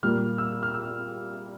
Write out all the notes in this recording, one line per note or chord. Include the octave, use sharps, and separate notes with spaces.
A#2 G3 A#3 F6
E6
F6
E6